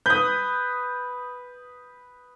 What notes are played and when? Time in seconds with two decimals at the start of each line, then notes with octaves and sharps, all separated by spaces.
0.06 B4 D#6 G6